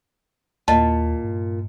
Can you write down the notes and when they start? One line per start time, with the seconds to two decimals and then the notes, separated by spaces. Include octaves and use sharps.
0.68 D#2 A#2 D#5 A5
1.24 G2